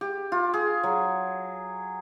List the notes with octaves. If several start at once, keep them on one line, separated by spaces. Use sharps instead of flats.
G4
F4
G#4
F#3